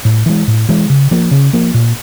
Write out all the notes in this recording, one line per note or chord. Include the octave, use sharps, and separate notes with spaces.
A2
E3 G#3
A2
E3 G#3
C#3
F3 A#3
C#3
F3 A#3
A#2